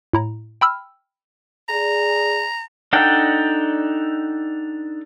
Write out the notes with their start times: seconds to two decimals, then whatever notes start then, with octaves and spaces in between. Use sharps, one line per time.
0.13 A2 E4 A#5
0.61 G5 B5 E6 F6
1.69 G#4 D5 A#5
2.93 D4 D#4 A4 F#5 G5